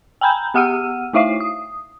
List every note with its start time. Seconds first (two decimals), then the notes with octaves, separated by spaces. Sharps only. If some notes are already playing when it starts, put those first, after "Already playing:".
0.21 G5 G#5 A#5 B5 G6
0.54 B3 G4 F#5 E6 F6 D#7
1.13 A3 D#4 E4 E5 F5 C7
1.40 D#6